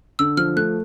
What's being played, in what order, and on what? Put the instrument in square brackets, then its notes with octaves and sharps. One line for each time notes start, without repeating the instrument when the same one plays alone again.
[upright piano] D3 [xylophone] E6
[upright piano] F3 [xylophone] F6
[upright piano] A3 [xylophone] F#6